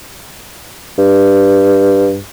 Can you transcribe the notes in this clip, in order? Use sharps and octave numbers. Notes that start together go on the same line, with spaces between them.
G2